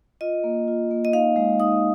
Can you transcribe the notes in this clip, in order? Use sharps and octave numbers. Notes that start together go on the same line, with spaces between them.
F4 D#5
A#3
F4
A#3
D#5
D#4 F5
G#3
D#4 D#6